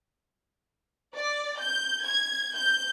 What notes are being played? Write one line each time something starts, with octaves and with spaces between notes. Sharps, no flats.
D5
G6
G#6
G6